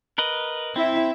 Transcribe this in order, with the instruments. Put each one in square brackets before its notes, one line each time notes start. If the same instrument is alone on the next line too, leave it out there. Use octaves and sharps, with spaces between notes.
[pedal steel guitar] A#4 B4 D#5
[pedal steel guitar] C4 [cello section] E4 E5